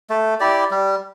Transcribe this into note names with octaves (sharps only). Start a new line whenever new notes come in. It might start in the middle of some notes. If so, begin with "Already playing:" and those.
A3
E4 G4 D5
G3